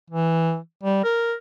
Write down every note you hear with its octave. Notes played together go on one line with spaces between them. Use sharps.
E3
G3
A#4